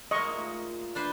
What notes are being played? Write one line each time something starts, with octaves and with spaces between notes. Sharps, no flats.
G#3 A#3 D#5 C#6
A#2 A3 D#4
D4 B4 C5